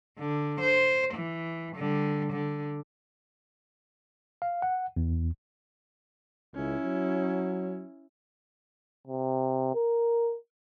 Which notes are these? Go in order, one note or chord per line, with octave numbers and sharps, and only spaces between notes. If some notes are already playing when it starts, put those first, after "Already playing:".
D3
C5
E3
D3 G3
D3
F5
F#5
E2
C#2 C#4 E4
F#3
C3
A#4